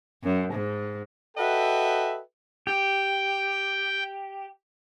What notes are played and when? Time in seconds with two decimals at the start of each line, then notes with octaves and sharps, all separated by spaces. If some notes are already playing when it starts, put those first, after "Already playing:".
0.23 F#2
0.53 G#2
1.38 F#4 A4 B4 D#5 E5 G5
2.67 G4 G5